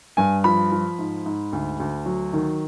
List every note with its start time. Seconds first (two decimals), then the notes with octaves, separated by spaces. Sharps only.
0.17 G2 G#5
0.44 F3 B5
0.72 F3
0.99 G#2
1.26 G#2
1.53 D2
1.80 D2
2.06 F#3
2.33 D#3